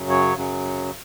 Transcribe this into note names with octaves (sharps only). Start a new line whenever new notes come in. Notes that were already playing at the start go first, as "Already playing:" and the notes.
Already playing: F#2 C#3 F#3
C#5
F#2 C#3 F#3